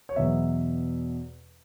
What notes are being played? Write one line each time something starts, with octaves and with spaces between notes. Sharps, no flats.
C#5
E2 B2 F#3 B3 E5